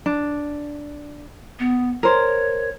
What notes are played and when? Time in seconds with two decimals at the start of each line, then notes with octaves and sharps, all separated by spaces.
0.06 D4
1.59 B3
2.03 A#4 C5 C#5